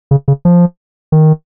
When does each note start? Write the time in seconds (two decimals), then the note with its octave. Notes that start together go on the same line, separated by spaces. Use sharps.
0.11 C#3
0.28 C#3
0.45 F3
1.12 D#3